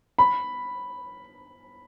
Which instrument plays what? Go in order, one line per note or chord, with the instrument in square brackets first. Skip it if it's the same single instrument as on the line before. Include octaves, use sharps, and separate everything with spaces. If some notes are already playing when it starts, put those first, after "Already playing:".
[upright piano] B5